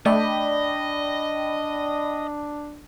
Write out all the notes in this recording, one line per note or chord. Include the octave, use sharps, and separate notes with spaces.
A3 D4 D5 D#5 G5 B5